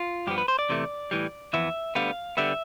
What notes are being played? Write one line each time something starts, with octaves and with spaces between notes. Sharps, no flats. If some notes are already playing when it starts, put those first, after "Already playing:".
Already playing: F4
G2 F3 B3 G4
B4
C5
D5
E2 C3 E3 A3
A2 E3 G3
F2 E3 B3 E5
D2 D3 G3 B3 F5
D3 G3 B3 E5